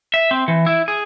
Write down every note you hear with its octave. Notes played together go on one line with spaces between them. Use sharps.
E5
C4
E3
E4
G#4